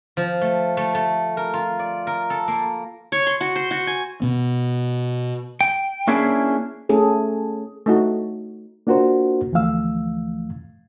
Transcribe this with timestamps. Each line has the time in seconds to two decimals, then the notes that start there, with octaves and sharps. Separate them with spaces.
0.17 F3
0.41 A3
0.77 A3
0.95 A3
1.37 A#4
1.54 F4
1.79 D5
2.07 A#4
2.30 A4
2.48 A#3
3.12 C#5
3.27 C6
3.41 F#4
3.56 C5
3.71 F#4
3.87 G#5
4.22 B2 B3
5.61 G5
6.07 A#3 C#4 D4 E4 G#4
6.89 A3 C#4 G#4 A4
7.86 A3 D#4 F#4
8.87 A#3 D4 F4 F#4 A#4 C5
9.52 D2 E3 F3 A3 F5 E6